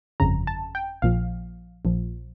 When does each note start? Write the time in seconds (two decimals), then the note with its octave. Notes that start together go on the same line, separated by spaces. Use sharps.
0.20 G1 F2 C#3 A#5
0.47 A5
0.75 G5
1.02 A#1 A#2 F3 F5
1.85 A#1 A#2 F3